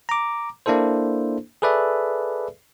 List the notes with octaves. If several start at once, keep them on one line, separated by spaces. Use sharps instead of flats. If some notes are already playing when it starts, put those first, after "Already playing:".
A#5 D6
A#3 D4 E4 A4 C5
G#4 A4 B4 D5 E5